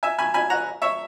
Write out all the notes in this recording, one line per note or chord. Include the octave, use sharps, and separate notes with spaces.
E5 G#5
G#5 B5
G#5 B5
F#5 A#5
C#5 E5